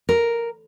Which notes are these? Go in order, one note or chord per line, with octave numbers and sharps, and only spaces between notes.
A#4